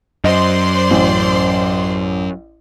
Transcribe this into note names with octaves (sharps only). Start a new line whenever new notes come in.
F#2 C5 D5 D#5 C6
A1